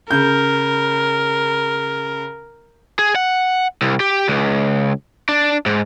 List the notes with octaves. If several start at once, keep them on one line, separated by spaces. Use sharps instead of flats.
C#3 A#4 G6
G#4
F#5
C2
G4
C#2
D4
G#2